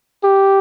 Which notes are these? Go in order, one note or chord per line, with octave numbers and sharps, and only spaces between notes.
G4